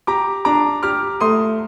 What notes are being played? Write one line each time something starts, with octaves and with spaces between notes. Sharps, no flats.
G4 A#5 D6
D4 A#5 D6
G4 D6 F6
A3 C6 D#6